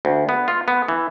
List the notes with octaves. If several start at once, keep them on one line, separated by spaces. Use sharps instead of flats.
D2
B3
F4
B3
E3